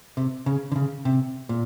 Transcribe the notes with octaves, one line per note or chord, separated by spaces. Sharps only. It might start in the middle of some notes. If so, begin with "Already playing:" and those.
C3
C#3
D3
C#3
C3
A#2